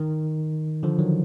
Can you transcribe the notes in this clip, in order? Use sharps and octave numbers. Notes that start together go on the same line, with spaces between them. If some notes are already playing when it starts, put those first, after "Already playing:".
Already playing: D#3
D3 F3
D#3 F#3